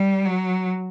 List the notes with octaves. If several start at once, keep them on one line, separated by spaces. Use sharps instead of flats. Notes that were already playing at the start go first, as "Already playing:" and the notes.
Already playing: G3
F#3